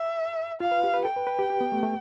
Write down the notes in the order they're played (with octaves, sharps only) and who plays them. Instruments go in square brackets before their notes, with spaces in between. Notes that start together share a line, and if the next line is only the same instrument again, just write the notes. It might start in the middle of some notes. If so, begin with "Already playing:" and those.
Already playing: [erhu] E5
[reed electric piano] F4 [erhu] F5
[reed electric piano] B4
G4
B4
[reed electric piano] A4 [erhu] G5
[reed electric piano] B4
B4
G4
G4
B3
A3
A3